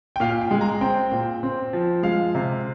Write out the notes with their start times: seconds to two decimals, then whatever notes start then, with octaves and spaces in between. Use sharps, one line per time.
0.16 G5
0.20 A#2 F5
0.41 G5
0.51 G#3
0.61 A#5
0.81 C4 G5
1.12 A#2
1.43 C4
1.73 F3
2.03 G#3 F5
2.35 C3